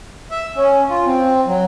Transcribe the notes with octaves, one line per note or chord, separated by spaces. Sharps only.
E5
C#4
F4
C4
F#3